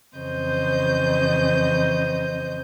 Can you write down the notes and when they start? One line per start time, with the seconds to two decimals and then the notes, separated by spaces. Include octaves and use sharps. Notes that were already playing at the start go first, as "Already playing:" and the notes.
0.16 F2 C#3 E3 C5 D#5 G6